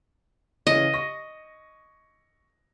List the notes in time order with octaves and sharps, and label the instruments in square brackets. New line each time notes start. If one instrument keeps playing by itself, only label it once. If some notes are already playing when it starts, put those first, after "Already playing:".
[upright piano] C#3 E3 C#5 [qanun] D#5
[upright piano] C#6 A#6